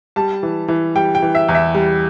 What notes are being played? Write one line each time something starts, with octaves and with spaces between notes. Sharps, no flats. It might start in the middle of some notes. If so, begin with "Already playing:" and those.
G3 A5
E3
E3
G3 G5
G5
E3
E5
E2
E5
G3